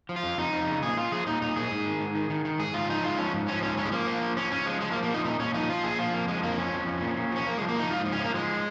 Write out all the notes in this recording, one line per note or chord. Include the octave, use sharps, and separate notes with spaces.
F3
F4
F2
F2 D#4
F2
C#3
A#2 G#4
A#2 F4
F3 G#4
A#2 D#4
A#2 D#4
A#2 G#4
G#2
D#3
G#2
D#3
D#3
D#3
G#2 G#4
G#2 F4
F3 D#4
G#2 F4
F3 C#4
G#2
F3 C#4
G#2 C#4
F3 C#4
G#3
F3 A#3
F3
F3
F3 C#4
F3 C#4
F3 G#3
F3 G#3
A#3
F3
A#3
A#2 D#4
A#2 D#4
A#2 C#4
F3 D#4
F3 F4
A#2 G#4
F3 F4
F2 A#3
F3 G#3
F2 A#3
F3 C#4
F2
F3
A#2
A#2
F3 C#4
F3 A#3
F3 G#3
A#3
F3 D#4
G#2 F4
F3
C#4
F3 A#3
F3 G#3